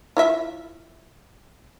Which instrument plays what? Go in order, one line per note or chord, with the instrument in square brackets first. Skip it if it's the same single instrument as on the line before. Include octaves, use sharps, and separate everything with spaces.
[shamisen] E4 F4 E5